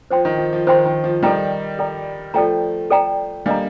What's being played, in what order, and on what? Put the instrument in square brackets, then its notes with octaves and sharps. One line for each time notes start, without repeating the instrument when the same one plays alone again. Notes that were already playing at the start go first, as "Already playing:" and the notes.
[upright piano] F3 [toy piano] C5 G5 C6
[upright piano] D#3
F3
F3
[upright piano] D#3 [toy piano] C5 G5 C6
[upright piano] D#3
F3
[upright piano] D#3 G3 [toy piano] A4 D5 G5 A#5
[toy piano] A4 D5 G5 A#5
[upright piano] F3 A3 [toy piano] A4 D5 G5 A#5
[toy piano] A4 D5 G5 A#5
[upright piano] G3 A#3 [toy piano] D4 A4 D#5 A#5